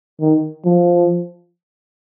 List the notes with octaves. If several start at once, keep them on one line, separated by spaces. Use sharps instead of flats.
D#3
F3